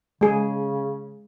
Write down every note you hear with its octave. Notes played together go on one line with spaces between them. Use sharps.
C#3 G#3 G#4